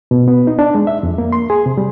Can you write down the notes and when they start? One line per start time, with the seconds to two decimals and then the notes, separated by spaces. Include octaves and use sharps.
0.11 B2
0.28 B3
0.47 D#4
0.59 D4
0.75 G#3
0.87 E5
1.03 F2
1.18 A#3
1.32 C6
1.50 G#4
1.66 C3
1.77 G3